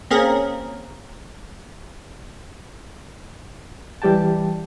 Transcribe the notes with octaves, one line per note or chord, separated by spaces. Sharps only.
A#3 C4 C#4 G#4 A#4
E3 G3 G4 G5 A5